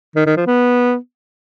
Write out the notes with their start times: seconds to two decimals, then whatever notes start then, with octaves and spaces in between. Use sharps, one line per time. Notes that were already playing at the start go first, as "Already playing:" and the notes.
0.16 D#3
0.26 D#3
0.36 F3
0.47 B3